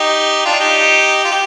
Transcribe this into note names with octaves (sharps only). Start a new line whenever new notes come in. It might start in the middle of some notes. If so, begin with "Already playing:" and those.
Already playing: D#4 G4
D4 F4
D#4 G4
F4
G4